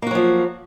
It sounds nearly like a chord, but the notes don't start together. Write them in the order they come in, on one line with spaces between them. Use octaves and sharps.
A#3 F#4 F#3 F3